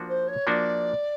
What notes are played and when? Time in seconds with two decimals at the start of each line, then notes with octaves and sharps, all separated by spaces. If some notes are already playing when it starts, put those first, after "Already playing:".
Already playing: F3 A#3 D4 F#4
0.08 C5
0.27 C#5
0.47 F3 A#3 D4 F#4 D5